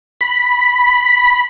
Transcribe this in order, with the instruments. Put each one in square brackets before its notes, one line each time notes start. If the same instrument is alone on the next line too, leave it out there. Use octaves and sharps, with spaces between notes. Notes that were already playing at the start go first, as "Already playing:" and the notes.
[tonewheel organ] B5